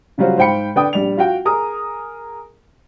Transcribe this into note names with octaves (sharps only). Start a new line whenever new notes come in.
C#3 F#3 G3 F4 F#4 C5
G#2 C5 F5 G5 B5 C#7
D3 B4 D5 G5 D#6
A#1 G3 D5 F7
F4 F#4 G5
G#4 A#4 A#5 D#6